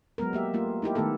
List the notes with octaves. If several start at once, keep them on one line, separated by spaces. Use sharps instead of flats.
F#3 G#3 B3 A#4
A#3 G4 E5
A3 A#3 F4
D#4 E4 G4 A#4
D#3 A3 B3 G4 A4